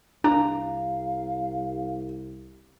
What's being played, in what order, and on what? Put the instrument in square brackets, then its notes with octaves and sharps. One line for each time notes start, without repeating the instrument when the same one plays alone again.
[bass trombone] C2 [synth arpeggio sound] D4 [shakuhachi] F5 [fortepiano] A#5